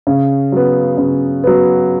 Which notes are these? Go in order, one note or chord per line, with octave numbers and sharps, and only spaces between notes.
C#3
F#3 B3
C#3
F#3 B3